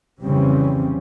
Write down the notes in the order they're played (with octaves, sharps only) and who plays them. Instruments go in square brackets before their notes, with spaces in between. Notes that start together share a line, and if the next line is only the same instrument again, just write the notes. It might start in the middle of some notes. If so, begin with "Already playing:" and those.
[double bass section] F1 C#3 E3 G3 C4 C#4